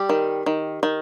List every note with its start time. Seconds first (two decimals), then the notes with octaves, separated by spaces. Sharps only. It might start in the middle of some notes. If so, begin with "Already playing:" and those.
Already playing: G3 G4
0.09 D#3
0.46 D#3
0.83 D#3